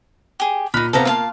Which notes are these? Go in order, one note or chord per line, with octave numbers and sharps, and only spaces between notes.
G4 G#4
A#2 D#4 B5 F6 F#6
C3 B3 C4 A4 F5 A#5
A#3 F4 F5 A5